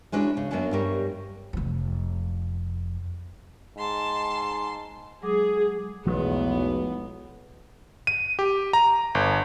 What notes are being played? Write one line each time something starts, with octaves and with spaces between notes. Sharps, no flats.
G#3 C#4 D4 E4 F#4
C#3
F#2 F#3 A#3 B3 C#4 D4
G2 G3 G4 A#4 C#5
F1 F2
G#2 A5 C6
F#3 G#3 G#4 D6
B1 E2 F3 G#3 A3 B3
D#7
G4
A#5
G1